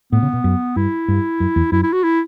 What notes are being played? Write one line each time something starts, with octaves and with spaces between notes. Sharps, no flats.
A2 B3
C#3
B2
F#2
G2 E4
G2
F#2
E2
F#2 E4
E4
F#4
E4